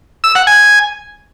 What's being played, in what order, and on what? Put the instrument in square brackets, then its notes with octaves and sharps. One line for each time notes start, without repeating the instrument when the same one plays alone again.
[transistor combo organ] E6
F#5
G#5